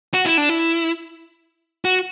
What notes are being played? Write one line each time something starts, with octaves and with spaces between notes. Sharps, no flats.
F#4
E4
D4
E4
F#4